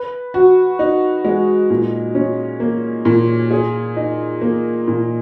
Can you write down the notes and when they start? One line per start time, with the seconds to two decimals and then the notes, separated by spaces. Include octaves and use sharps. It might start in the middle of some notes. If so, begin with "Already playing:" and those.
Already playing: B4
0.34 F#4
0.79 D#4
1.25 G#3
1.70 A#2
2.15 C#4
2.60 A#3
3.05 A#2
3.51 G#4
3.97 D#4
4.41 A#3
4.88 A#2